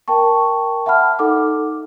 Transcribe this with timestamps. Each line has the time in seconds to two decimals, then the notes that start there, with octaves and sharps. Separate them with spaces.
0.08 A#4 G5 A5 C#6
0.86 E5 F#5 A5 B5 F6
1.19 D#4 A4 F#5 D6